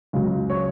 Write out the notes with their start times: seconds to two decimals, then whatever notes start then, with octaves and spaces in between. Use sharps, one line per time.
0.13 C#2 C#3 F#3
0.50 C#5